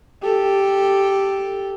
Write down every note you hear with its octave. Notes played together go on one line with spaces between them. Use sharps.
G4 A4